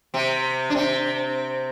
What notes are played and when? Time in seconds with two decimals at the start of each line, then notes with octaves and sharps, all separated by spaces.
0.14 C3 C4
0.70 D4
0.74 C3 C4